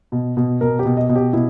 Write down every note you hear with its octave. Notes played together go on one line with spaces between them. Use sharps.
B2
B2
B2 A#4
G4
B2
D#5
B2
G4
B2 E4